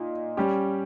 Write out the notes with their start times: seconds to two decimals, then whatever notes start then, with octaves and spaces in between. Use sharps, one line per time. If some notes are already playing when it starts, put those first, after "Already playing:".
Already playing: A#2 D#4
0.37 G3 C#4 G4